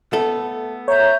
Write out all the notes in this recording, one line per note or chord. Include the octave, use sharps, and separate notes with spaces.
A3 B3 A4
C#5 E5 A#5 G6